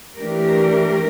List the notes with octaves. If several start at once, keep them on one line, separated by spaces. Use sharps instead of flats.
E3 A3 D4 G4 A#4